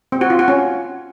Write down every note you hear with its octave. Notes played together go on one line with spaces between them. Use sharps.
C4
F#4
F4
F#4
C#4